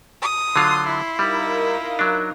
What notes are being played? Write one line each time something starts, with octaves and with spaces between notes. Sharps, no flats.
D#6
D3 F#3 F4 C6
E4
G3 D#4 F4 A#4
F#3 D4